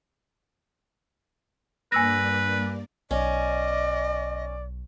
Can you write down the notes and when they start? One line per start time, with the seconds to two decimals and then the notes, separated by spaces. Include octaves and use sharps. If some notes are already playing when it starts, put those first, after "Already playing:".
1.92 G2 A#3 B4 D5 G#5 E6 A#6
3.11 B1 C#4 D5 D#5